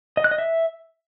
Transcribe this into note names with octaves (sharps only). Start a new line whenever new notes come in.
D#5
F#6
D#5
E5